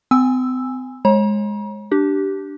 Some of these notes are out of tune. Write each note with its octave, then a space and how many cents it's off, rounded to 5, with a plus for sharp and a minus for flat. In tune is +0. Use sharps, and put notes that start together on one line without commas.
C4 -45 G#5 -15 E6 +0
G#3 +0 C#5 -35 A#5 +40
D4 +0 G4 -15